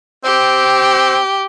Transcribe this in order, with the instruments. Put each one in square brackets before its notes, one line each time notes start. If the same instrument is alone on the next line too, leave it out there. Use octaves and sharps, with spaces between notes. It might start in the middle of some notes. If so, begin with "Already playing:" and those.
[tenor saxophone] C4 [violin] G4